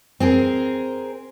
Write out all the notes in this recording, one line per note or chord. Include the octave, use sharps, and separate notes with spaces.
C4 G#4 A#4